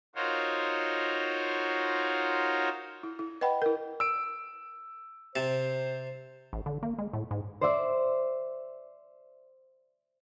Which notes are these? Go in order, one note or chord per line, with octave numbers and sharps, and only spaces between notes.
D#4 F4 F#4 A#4 C5 C#5
E4
E4
B4 D#5 F#5 G5 B5
E4 A#4
E6 D7
C3 C5 A5
A1
D3
A#3
G#3
A2
G#2
C5 D5 E5